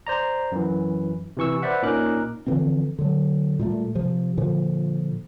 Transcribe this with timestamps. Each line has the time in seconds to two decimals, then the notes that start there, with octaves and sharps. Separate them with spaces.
0.07 C5 D5 A#5
0.52 F#2 E3
1.37 C3 E3 C#6 E6
1.62 B4 C5 D5 E5 F#5
1.82 A#2 C#4 D#4 A#4 D6 F#6
2.47 D3 E3 F3 C4
2.99 D3 F#3
3.59 A#2 G3 A3
3.95 C3 F3
4.37 A#2 D3 F3